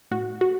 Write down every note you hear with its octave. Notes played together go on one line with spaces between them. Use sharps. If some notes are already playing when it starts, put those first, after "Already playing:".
A2 F#4
F#4